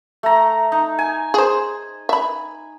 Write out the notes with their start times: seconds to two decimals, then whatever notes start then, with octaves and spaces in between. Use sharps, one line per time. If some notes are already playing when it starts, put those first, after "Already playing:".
0.23 A3 A#5
0.72 D#4
0.99 G#5
1.34 G#4 C5
2.09 E5 B5